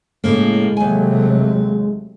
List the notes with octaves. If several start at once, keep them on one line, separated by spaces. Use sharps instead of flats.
A2 C#3 G#3 A#3
D#2 C3 F#3 A3 G#5